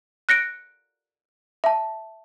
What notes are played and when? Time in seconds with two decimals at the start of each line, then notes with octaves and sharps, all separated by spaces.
0.29 F#6 A#6 C#7 D7
1.64 E5 A5